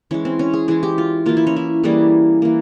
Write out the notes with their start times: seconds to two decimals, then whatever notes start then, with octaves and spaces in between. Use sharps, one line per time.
0.11 E3 G#3 C#4
0.25 C4
0.39 C#4
0.53 G#4
0.68 E3 G#3 G#4
0.83 G4
0.98 F4
1.26 E3 A#3 F4
1.37 E4
1.47 C#4
1.56 E4
1.84 E3 G3 A#3 G#4
2.42 E3 A#3